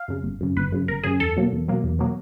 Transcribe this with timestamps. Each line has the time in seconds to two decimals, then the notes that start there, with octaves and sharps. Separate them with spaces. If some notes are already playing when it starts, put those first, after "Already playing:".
Already playing: F5
0.08 F#2 C#3
0.24 G1
0.41 F#2 C#3
0.56 G1 B4
0.72 F#2 C#3
0.88 G1 A#4
1.03 F#2 C#3 G#4
1.20 E2 A4
1.37 B2 F#3 A#3
1.52 E2
1.68 B2 F#3 A#3
1.84 E2
1.99 B2 F#3 A#3